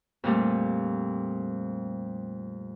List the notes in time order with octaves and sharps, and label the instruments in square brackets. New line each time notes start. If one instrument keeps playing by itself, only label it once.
[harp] F2 A#2 G3 A3